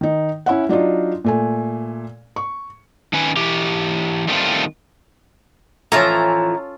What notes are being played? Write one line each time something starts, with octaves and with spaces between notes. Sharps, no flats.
D#3 D#4
C#4 E4 E5 F#5
F#3 D4 D#4 F4
A#2 A3 G#5
C#6
D#3 C#4 B4 G#5
E3 G4
D#3 G3 A3 A#3 C4 F4
A2 E3 F3 C#4 F4 A4 A#5